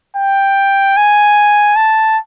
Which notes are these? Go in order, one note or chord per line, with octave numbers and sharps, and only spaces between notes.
G5
G#5
A5